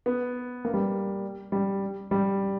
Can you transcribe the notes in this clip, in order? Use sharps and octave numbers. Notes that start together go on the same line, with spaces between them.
B3
A#3
G3
G3
G3